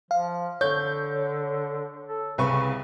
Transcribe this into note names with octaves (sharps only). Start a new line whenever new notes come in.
F3 F5
D3 C#5 G6
A4
C2 C#3 B4 C#6